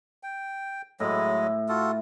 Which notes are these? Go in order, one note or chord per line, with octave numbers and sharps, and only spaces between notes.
G5
A2 F#3 G#3 D#5
F4 F#4 A4